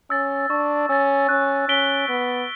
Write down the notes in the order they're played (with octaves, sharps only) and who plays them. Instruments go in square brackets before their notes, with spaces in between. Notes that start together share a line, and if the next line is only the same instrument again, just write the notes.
[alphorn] C#4 [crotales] E6 A6
[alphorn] D4 [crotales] C#6
[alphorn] C#4 [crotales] E6 A6
[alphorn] C#4 [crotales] F#6
[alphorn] C#4 [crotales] B6 D7 G7
[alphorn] B3 [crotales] F#6